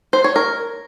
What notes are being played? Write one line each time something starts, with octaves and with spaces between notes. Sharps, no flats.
C5
C#5
A#4